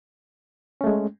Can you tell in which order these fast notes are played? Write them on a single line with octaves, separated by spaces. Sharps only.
C#4 A3 G#3